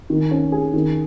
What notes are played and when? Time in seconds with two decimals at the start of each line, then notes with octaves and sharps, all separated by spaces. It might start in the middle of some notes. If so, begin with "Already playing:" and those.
0.10 D#3
0.31 C#4
0.52 G#4
0.74 D#3